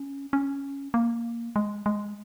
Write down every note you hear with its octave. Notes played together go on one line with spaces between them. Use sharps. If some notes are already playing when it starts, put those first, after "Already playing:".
Already playing: C#4
C#4
A#3
G#3
G#3